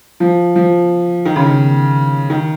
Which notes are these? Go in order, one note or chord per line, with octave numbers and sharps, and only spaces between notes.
F3
F3
D#3
C#3
D#3
D#3